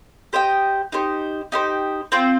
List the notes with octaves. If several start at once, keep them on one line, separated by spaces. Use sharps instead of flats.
G4 C5 D#5 G5
D#4 G4 C5
D#4 G4 C5
C4 F4 C5 G5